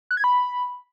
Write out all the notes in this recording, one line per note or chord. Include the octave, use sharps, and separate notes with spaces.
F#6
G#6
B5